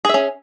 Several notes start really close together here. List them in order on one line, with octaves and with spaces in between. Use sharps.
G#4 E5 C#4